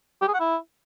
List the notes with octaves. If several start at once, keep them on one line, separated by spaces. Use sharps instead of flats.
G4
G#4
F#5
E4